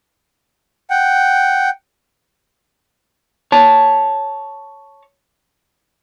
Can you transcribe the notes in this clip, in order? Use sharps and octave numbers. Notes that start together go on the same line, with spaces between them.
F#5 G5
C#5 A5